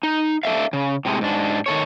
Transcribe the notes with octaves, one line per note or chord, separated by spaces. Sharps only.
D#4
D4 A4 E5 F5
C#3
A2 C3 G#3
G#2 D4
D#3 A4 C#5